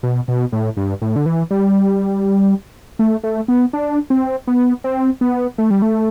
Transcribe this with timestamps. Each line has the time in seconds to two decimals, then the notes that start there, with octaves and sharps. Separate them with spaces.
0.03 B2
0.28 B2
0.52 A2
0.77 G2
1.02 A2
1.16 D3
1.26 E3
1.51 G3
2.99 A3
3.24 A3
3.48 B3
3.73 D4
4.10 C4
4.47 B3
4.84 C4
5.21 B3
5.58 A3
5.70 G3
5.82 A3